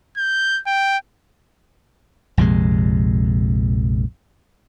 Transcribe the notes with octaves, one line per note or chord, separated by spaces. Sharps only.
G6
G5
A#1 F2 C3 G#3